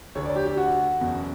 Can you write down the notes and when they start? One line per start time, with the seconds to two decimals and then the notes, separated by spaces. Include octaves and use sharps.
0.15 D2 D3 C#5
0.26 D5
0.36 G4
0.46 G4
0.57 F#4
1.01 F#1 E2 B2